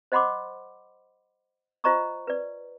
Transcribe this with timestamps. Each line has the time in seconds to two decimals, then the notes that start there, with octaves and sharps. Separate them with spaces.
0.12 C5 D#5 F#5 B5 C6 D6
1.84 F4 C5 D#5 A#5 C#6 D#6
2.27 B4 D5